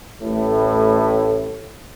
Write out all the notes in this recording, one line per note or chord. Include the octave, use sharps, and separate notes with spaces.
A1 A2